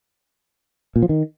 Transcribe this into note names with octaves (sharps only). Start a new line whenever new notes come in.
A#2
F3
D#3